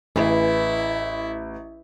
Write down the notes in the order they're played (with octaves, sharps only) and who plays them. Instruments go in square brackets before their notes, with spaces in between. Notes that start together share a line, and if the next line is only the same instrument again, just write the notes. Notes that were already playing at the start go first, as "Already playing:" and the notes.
[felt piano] A1 [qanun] E3 G#4 [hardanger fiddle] E4